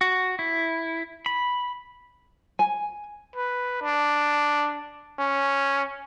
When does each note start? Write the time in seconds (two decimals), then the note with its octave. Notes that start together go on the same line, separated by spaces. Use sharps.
0.01 F#4
0.39 E4
1.26 B5
2.59 G#5
3.36 B4
3.82 D4
5.19 C#4